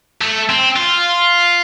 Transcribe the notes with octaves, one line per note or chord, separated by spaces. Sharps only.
A3
C4
F4